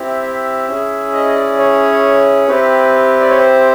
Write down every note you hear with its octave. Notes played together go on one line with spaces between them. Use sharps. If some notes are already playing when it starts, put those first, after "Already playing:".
Already playing: C4 E4 G4
E5
E5
C#4 E4 G#4
D#5
D#5
D5
C#5
C4 E4 G4 B4
D5
C#5
C5